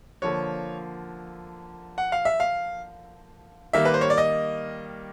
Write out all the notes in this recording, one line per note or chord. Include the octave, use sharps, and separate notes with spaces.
D3 F3 A#3 C#5
F#5
F5
E5
F5
D#3 G3 A#3 E5
B4
C5
C#5
D5
D#5